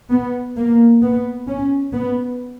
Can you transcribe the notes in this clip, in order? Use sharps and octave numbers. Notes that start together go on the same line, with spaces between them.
B3
A#3
B3
C#4
B3